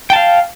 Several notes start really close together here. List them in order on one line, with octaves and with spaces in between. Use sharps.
G5 A5 F5